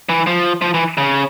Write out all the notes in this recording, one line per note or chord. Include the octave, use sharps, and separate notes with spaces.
E3
F3
F3
E3
C#3